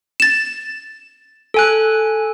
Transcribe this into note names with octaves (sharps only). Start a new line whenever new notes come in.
A6 E7
A4 G#5 F#6